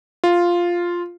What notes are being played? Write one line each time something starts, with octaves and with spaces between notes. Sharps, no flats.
F4